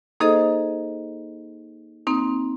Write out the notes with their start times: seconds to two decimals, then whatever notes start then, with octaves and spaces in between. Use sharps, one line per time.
0.20 A#3 D#4 G#4 A4 C5 D#5
2.07 A#3 C4 D#4